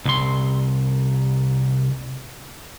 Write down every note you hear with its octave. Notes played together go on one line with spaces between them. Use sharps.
C2 C6